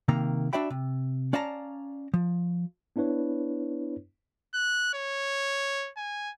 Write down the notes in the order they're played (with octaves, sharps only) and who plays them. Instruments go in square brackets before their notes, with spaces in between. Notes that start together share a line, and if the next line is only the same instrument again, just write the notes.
[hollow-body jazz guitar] C3 D#3 A#3 A#5
D4 F#4 D5 E5 G5 B5
C3
C#4 D5 F5 A5 A#5
F3
[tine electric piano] B3 D4 E4 B4 C#5
[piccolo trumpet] F#6
C#5
G#5